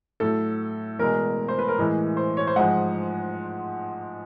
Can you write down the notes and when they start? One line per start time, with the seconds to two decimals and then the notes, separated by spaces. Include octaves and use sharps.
0.20 A2 F#3 A4
0.99 E2 B2 G#3 A#4
1.48 C5
1.59 B4
1.68 A#4
1.78 A2 E3 G#3
2.17 C5
2.37 C#5
2.47 C5
2.56 G#2 F3 G#3 F#5